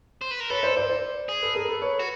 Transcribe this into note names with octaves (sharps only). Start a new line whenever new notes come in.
C5
B4
A#4
A4 B4 C#5
C5 D5
C5 D5
C5 D5
G#4
A4 B4
G#4 A#4
A4 B4
B4 C#5
F#4